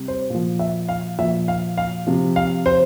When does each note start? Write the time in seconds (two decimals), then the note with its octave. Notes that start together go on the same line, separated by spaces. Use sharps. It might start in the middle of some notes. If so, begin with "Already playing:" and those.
Already playing: C3 G3
0.08 C5
0.30 A#2 F3
0.59 E5
0.89 F5
1.19 A#2 F3 E5
1.48 F5
1.77 F5
2.07 C3 F3
2.36 F5
2.66 C5